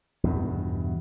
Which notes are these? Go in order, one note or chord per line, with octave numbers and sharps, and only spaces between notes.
E2 G2 B2